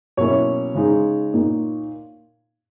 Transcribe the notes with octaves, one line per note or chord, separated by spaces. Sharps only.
B2 F#3 A#3 C#4 E4 C#5
C#3 G#3 D#4
A#2 A#3 D#4